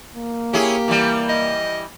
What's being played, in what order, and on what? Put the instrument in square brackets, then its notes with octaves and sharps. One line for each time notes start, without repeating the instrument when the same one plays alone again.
[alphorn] A#3
[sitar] C#4 E4 G#4 [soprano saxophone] G4
[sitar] E3 G3
[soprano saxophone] D#5